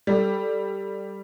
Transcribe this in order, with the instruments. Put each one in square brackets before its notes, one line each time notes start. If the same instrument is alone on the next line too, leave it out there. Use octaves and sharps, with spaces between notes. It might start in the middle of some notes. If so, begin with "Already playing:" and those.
[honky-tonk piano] G3 A4